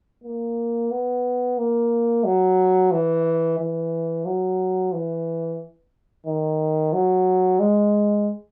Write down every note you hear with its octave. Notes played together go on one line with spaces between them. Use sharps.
A#3
B3
A#3
F#3
E3
E3
F#3
E3
D#3
F#3
G#3